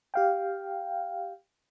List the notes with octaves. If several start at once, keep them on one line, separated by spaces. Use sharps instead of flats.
G4 F5 G5